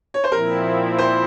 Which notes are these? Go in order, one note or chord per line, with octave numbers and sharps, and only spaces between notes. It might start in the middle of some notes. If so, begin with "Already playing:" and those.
C#5
C5
A#2 F3 C4 E4 A#4
C5